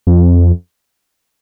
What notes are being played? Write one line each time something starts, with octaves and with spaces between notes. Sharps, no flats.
F2